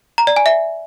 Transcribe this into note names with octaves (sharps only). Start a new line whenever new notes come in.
A#5
D5
G#5
E5